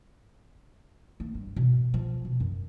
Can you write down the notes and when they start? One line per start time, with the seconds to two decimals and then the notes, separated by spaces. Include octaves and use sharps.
1.20 A#3
1.35 G2
1.56 B2
1.94 F3
2.25 B2
2.40 F#2